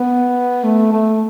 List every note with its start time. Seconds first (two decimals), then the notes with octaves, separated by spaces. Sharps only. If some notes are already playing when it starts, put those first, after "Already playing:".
Already playing: B3
0.64 A3
0.92 A3